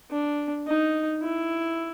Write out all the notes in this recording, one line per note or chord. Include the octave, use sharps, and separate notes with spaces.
D4
D#4
E4